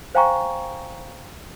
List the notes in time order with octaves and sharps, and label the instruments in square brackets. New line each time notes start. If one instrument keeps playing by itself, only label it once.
[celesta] C5 F5 G5 G#5 A#5 C#6